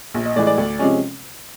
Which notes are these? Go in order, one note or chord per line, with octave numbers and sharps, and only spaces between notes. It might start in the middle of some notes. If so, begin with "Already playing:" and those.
A#1
D#5
A2 E3 G#3 D5
D5
D2
C3 F3 G#3 C#4